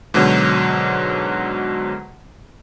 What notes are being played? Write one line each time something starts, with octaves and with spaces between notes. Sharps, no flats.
G#2 B2 D3 F#3